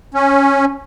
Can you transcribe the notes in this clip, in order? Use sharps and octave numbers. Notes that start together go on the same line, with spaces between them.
C#4